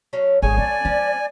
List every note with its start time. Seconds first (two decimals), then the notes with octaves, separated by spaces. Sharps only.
0.13 F#3 A3 C#4
0.42 G#1 D3 G#4 A4 C#5 G#5
0.57 C4 D5
0.85 F3 C4